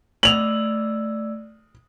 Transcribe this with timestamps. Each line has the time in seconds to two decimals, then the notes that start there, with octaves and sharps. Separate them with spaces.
0.23 A3 D5 E6 F7 F#7